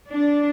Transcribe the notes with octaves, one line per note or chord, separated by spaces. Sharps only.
D4